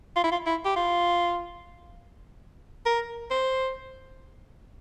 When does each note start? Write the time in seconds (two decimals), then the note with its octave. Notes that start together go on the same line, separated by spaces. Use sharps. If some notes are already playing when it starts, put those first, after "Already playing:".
0.16 F4
0.24 E4
0.32 F4
0.47 E4
0.65 G4
0.76 F4
2.86 A#4
3.31 C5